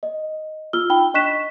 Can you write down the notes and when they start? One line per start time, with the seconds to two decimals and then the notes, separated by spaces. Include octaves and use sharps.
0.03 D#5
0.73 F4 E6 F6 G7
0.90 D#4 G5 B5 G7
1.14 D4 D#5 C#6 F#6 B6 E7